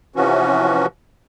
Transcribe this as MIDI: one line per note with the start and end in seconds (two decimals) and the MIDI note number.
0.16 0.86 48
0.16 0.86 52
0.16 0.86 53
0.16 0.86 61
0.16 0.86 66